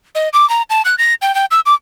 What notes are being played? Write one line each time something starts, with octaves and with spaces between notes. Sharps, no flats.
D#5
D6
A#5
A5
F#6
A#6
G5
G5
E6
D6